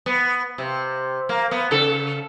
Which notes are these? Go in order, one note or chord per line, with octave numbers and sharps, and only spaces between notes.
B3
C3
A#3
B3
C#3 A4